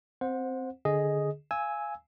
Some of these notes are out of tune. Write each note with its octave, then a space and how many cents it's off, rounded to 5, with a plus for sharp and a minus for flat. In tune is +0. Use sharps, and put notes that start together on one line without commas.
C4 -5 C5 +0 F#5 -25
D3 +0 G#4 +0 D#5 +0
F5 -20 G#5 +0 E6 -15